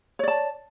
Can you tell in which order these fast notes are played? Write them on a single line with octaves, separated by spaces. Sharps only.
C#5 D5 A5